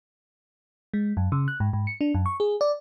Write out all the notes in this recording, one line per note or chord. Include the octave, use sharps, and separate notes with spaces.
G#3
F#2
C#3
F#6
G#2
G#2
C#7
D4
F#2
C#6
G#4
D5